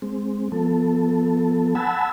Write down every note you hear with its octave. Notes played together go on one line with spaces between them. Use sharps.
G#3 C4
F3 B3 A4
F#5 G#5 A5 B5 E6